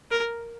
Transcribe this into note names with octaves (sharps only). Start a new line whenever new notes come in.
A#4